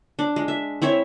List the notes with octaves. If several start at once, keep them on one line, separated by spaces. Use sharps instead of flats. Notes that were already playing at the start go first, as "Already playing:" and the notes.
D4
G#3
E5
C4 E4 C#5 E5